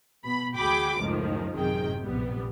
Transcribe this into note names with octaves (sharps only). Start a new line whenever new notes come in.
B2 B5
D2 F#4 G#4 G5 B5 D6
C#2 F#2 A2 D#3 F3
A1 F#2 C3 D#3 G#4 G5
A#1 C3 G3 B3